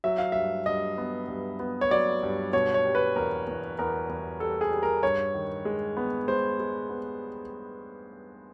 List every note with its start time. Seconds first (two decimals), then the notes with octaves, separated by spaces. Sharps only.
0.04 F#3 E5
0.18 F5
0.32 G2 E5
0.66 G2 D#5
0.98 B3
1.28 G2
1.59 B3
1.81 C#5
1.91 F#3 D5
2.23 G2
2.53 B2 C#5
2.74 C#5
2.85 G3
2.95 B4
3.16 E2 A#4
3.47 E2
3.79 E2 A#4
4.09 E2
4.40 G3 A4
4.61 G#4
4.72 G3
4.83 A#4
5.03 G2 C#5
5.34 D#3
5.65 G#3
5.97 B3
6.28 G#3 C5
6.59 G#3
6.90 B3